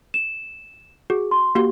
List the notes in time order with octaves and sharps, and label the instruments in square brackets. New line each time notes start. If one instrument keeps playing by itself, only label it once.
[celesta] E7
[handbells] F#4 [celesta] G#4
[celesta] C6
[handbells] A#3 F#4 C6 [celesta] G4